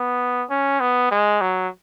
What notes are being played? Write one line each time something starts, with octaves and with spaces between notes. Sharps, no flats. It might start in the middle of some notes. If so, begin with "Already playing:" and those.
Already playing: B3
C#4
B3
G#3
F#3